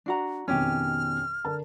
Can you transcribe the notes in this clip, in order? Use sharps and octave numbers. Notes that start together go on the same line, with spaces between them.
D4 F#4 A#5
F2 B2 D#3 C#4 G4 F6
D3 A#4 A5